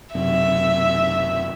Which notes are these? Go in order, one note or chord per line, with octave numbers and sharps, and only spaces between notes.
B1 F#2 C3 E5